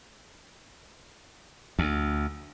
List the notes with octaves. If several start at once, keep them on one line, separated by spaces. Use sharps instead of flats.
D2